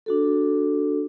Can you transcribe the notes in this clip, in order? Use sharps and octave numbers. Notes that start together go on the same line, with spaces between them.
D4 F#4 A4